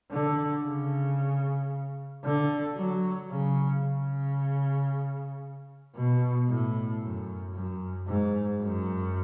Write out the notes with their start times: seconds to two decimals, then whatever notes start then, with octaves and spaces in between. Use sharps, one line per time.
0.11 D3
0.64 C#3
2.24 D3
2.76 F#3
3.30 C#3
3.83 C#3
5.95 B2
6.49 A2
7.02 F#2
7.54 F#2
8.08 G#2
8.62 F#2